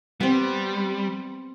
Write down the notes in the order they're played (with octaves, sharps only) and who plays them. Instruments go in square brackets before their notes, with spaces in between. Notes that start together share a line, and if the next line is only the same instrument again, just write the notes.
[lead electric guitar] G3 [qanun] B3 C4